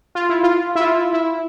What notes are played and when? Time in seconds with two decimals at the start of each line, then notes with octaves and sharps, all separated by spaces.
0.15 F4
0.29 E4
0.43 F4
0.75 E4
0.80 F4
1.13 E4